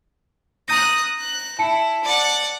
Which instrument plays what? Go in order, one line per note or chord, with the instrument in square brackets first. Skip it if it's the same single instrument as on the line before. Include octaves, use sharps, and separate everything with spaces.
[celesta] A#5 G6 A#6 [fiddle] D#6 F#6
[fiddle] F#6
[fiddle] E4 [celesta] A5 C#7
[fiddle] D5 F#5